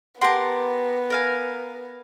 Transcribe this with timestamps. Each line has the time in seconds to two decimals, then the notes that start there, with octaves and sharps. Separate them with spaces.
0.21 B3 G4 A#4 F#5 A5 C6
1.10 A#4 F5 G#5